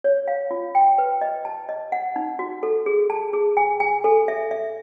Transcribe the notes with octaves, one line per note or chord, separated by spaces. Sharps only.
C#5
F5
F4
G5
B4
D#5
A5
D#5
F#5
D#4
F#4
A4
G#4
A5
G#4
G#5
G#5
A4
E5
E5